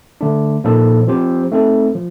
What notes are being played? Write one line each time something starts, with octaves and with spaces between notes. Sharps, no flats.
D3 A3 D4
A#2 F3 A#3 D#4 A4
F3 C4 G4 C5
A3 C4 D#4 A4
F3